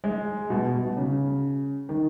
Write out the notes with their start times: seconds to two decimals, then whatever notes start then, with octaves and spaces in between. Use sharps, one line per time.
0.04 G#3
0.50 B2
0.77 B2
0.97 C#3
1.89 D#3